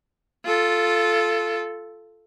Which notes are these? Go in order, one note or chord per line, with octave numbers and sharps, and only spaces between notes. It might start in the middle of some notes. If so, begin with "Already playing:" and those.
F4 A4